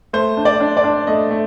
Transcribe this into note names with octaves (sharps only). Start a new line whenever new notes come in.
A3 C5
D4
D5
D4
D5
D4
A3 D#5
A3